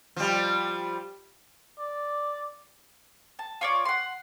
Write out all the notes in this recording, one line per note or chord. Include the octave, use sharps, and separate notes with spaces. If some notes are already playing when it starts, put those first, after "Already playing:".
F3 G3
D5
A5
F4 C#5 D5
F#5 C6